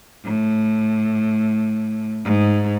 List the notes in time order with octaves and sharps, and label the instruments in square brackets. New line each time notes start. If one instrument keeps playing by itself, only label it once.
[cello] A2
G#2